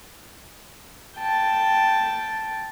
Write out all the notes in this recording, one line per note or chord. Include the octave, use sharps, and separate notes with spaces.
G5 A5